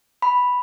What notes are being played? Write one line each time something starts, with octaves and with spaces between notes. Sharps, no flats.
B5